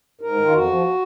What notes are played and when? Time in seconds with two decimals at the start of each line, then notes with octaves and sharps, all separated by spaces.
0.21 G#2 A#4
0.36 D#3
0.45 F4
0.52 F2 F#4
0.67 F3